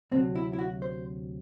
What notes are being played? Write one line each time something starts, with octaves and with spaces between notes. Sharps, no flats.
D2 C3 F#3 C4
E4
E4
F#4
C5